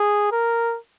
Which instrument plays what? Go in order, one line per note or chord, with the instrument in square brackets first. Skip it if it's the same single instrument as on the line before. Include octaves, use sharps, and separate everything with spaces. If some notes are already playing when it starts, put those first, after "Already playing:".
Already playing: [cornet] G#4
A#4